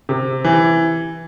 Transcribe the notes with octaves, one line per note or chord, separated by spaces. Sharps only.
C3
E3